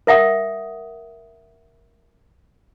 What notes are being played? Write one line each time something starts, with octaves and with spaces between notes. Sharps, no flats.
A#4 E5 F#5 D#6